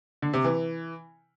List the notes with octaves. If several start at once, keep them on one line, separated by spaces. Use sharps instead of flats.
D3
C3
E3